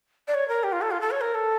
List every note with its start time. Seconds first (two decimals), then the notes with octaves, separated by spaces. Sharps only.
0.28 D5
0.34 C#5
0.48 A#4
0.63 G4
0.72 F4
0.81 A4
0.91 F4
1.01 A4
1.11 C#5
1.21 A#4
1.34 A4